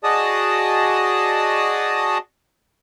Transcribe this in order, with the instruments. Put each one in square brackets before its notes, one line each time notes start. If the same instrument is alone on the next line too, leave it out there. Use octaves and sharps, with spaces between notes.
[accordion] F#4 G#4 D5 D#5 A5 D#6